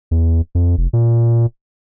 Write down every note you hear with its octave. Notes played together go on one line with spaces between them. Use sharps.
E2
F2
F1
A#2